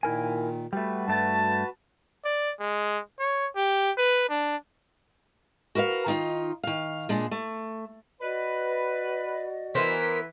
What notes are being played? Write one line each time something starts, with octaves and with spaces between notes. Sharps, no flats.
A#2 D#3 E4 A#4 G#5
G3 A3 F#4 B4
G2 A3 A5
D5
G#3
C#5
G4
B4
D4
F#4 A#4 B4 E5 F5
D#3 D#4 F4
D#3 F5
A#2 G#3 D4
A3
F#4 B4 D5 D#5
E3 B3 A#4 C5 B6